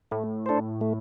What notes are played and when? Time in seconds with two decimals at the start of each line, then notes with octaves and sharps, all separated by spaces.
0.11 A2 A3
0.46 D4 A4 C5
0.81 A3